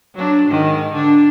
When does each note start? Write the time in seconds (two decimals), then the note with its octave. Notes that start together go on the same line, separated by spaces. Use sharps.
0.15 F#3 D4
0.48 G#2 D#3
0.91 D3 D4